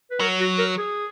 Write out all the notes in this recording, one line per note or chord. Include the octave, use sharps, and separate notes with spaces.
B4
F#3 A#4
F#4
A#4
G#4